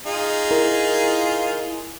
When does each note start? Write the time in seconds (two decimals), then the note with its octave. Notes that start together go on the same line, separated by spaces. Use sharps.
0.06 D#4 F4 G#4
0.51 E4 A#4